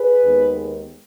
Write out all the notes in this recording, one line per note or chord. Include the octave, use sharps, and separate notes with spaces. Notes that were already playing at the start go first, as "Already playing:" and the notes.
Already playing: G#4 B4
D#2 D#3 G#3 B3